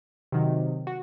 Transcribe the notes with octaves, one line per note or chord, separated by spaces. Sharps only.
C3 D#3 F#3
F#4